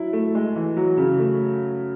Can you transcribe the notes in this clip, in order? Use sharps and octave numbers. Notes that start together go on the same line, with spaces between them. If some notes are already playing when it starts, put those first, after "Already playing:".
Already playing: F#3 E4
A3
G#3
E3
F#3
C#3
A3